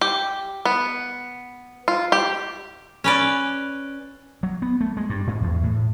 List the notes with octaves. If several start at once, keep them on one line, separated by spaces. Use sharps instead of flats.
G4
B3
F4
G4
C#4 B4 D5
F#3
B3
A3
G#3
G2
G#2
E2
A2